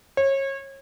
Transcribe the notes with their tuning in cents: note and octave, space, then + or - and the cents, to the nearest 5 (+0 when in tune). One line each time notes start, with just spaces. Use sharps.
C#5 -30